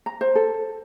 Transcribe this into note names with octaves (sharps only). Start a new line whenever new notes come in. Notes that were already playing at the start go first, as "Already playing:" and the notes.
A#5
C5
A4